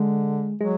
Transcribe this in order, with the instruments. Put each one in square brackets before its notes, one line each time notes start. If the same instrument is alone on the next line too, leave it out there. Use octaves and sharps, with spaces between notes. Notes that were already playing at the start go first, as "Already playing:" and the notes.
Already playing: [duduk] D3 [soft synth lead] G#3
[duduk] F#3 [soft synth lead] G#3